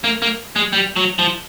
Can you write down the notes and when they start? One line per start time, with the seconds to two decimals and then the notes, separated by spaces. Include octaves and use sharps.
0.04 A#3
0.22 A#3
0.56 G#3
0.73 G3
0.96 F#3
1.19 F3